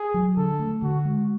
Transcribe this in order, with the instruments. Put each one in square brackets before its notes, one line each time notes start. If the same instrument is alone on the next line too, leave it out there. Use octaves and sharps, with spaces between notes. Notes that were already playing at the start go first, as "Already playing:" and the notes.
Already playing: [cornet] G#4
[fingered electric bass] F#3
[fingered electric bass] D3 [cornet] A4
[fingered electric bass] A3
[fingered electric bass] D3 [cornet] F#4
[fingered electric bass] G#3